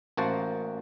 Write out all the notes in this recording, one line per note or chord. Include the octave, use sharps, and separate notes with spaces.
A1 A#3 F#4 C5 F#5 A5